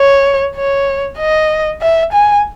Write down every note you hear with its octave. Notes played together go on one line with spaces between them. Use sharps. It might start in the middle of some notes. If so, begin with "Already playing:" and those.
Already playing: C#5
C#5
D#5
E5
G#5